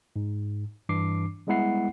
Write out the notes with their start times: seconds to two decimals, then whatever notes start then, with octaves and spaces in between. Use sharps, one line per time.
0.16 G#2
0.89 G2 E3 D4 D6 C7
1.47 G3 G#3 B3 E4 F#5 C7